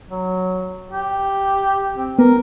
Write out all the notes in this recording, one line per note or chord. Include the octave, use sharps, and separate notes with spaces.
F#3
G4
C4
B3 A#4